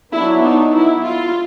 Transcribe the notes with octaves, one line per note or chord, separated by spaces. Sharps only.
F#3 B3 D4 E4
D#4
E4
F4